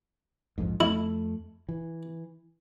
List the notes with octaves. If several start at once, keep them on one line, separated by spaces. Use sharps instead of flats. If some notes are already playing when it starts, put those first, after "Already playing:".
A#1 F2 G#2
F2 A3 E4
E3